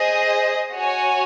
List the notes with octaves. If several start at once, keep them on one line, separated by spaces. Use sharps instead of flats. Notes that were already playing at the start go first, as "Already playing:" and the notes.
Already playing: G#4 C5 D#5
F#4 C#5 G#5